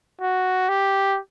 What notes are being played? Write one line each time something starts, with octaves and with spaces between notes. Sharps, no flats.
F#4
G4